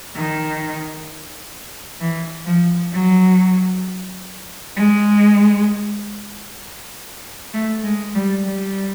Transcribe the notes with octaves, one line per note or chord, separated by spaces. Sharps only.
D#3
E3
F3
F#3
G#3
A3
G#3
G3
G3